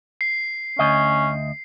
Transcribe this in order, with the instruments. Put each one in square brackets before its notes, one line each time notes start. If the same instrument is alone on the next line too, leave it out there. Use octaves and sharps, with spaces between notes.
[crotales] C7
[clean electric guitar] D2 D#5 [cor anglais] C#4